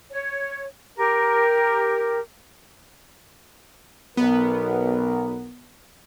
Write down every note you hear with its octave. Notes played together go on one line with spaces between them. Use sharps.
C#5
G4 A#4
B1 B3 A#4